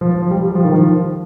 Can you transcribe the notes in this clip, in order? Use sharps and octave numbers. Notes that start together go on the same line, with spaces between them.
F3
F3
G3
G3
F3
D#3
F3